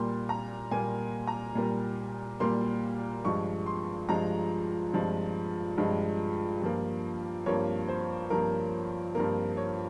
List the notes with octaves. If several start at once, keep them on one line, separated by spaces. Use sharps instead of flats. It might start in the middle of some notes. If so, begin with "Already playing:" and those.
Already playing: A#2 G3 A#3 C6
A#5
A#2 G3 A#3 G#5
A#5
A#2 G3 A#3
A#2 G3 A#3 C6
G2 F3 G#3 C#6
C6
G2 F3 G#3 A#5
G2 F3 G#3
G2 F3 G#3
G2 F3 A#3
G2 F3 A#3 C#5
C5
G2 F3 A#3 A#4
G2 F3 A#3 A#4
C#5